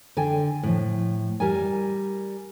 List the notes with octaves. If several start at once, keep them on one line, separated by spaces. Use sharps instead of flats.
D3 G5 G#5
A2 F3
G3 A#4 G#5